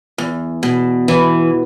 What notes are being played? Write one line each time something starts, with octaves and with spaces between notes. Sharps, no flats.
E2
B2
E3